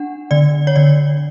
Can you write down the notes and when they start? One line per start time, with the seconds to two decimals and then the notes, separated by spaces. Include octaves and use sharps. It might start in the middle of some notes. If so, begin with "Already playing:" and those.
Already playing: D4 F#5
0.31 D3 D5
0.67 C#5
0.76 D3 D5